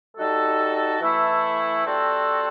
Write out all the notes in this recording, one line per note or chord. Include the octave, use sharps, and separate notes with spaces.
G3 D#4 F#4 A4
E3 A3 E4 A4
G3 C4 F#4 A4